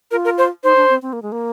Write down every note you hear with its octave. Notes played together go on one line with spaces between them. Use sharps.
F4 A#4
A#4
C5
D#4 C5
D4
C4
C4
A#3
G#3
A#3